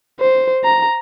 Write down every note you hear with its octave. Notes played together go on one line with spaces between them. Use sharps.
C5
A#5